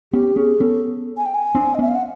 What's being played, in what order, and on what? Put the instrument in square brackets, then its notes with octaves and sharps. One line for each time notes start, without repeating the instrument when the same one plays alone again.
[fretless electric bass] B3 C#4 [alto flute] G4
[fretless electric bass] B3 C#4 [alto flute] G#4
[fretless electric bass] B3 C#4 [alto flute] A4
[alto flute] G#5
G5
G#5
[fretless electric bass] C4 D4
[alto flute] D#5
[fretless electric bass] B3 C#4 [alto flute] E5
[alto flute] F5
F#5